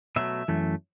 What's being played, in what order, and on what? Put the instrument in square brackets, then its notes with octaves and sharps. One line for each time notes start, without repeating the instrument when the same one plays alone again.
[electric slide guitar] B2 F#3 A3 E5
F#2 E3 A3